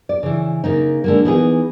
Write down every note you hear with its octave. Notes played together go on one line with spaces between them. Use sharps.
D5
C#3 E3
C#3 A#3 D#4
D3 G#3 A#3
E3 B3 D#4 E4 G#4